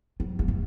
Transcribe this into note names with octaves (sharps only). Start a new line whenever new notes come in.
F#3
G#3
A3